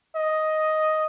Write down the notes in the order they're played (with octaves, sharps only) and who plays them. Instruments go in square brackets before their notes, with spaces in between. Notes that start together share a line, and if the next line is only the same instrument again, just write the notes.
[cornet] D#5